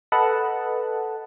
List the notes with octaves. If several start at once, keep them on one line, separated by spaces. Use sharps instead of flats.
A4 B4 D#5 F#5 A5